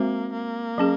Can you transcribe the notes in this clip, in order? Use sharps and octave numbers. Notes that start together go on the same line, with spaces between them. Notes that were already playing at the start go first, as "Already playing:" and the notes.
Already playing: G#3 A#3 C4 F#4 C5
A#3
F#3 C#4 G#4